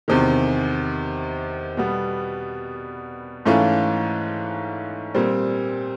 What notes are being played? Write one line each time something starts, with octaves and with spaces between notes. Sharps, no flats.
E2 C3 D#3
B2 G3 B3
G#2 E3 A3 C#4 F4
A#2 G3 C4